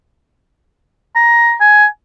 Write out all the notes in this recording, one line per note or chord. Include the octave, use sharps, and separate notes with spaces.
A#5
G#5